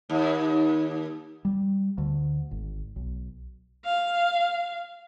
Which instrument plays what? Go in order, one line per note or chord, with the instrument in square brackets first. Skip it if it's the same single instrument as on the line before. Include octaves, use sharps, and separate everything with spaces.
[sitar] D#2
[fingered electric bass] G3
D2
G#1
B1
[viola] F5